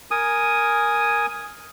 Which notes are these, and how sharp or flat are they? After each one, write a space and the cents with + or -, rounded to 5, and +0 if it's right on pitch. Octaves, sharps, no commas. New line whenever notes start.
A#4 +0 G#5 +0 D#6 +0